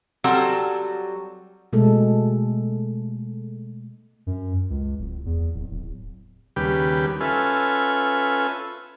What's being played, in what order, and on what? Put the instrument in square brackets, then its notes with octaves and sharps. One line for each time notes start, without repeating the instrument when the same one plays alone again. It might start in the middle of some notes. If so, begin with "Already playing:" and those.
[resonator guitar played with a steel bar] F#3 G3 C4 A4 F#5 A5
[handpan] B2 G#3 A3 A4
[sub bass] F#2
C#2
D1
E2
D1
D1
[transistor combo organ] D#2 C#3 G3 G4 B4
C#4 F4 A4 B4 E5 G#5